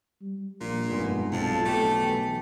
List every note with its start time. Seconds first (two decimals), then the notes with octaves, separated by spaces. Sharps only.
0.21 G3
0.61 A#1 A#2
0.90 F1 G2 B2 G#3
1.32 B1 F2 A5
1.66 A3 G4 G5
2.02 E3